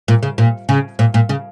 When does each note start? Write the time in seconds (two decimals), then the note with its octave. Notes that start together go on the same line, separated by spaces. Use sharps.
0.08 A#2
0.23 C#3
0.38 A#2
0.69 C#3
0.99 A#2
1.14 A#2
1.29 C#3